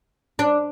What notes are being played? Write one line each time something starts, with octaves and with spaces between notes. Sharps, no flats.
D4